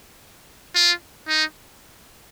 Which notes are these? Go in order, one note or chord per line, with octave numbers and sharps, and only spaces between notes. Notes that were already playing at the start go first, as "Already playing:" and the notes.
F4
D#4